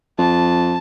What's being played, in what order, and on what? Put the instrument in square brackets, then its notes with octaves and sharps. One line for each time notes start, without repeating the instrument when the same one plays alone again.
[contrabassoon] F2 [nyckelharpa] A5